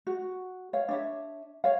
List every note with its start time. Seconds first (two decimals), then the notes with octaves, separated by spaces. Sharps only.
0.07 F#4
0.73 C#5 F5
0.88 D4 C#5 E5
1.64 C#5 F5